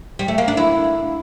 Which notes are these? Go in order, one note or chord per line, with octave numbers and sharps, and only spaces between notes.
G3
A3
A#3
D4
E4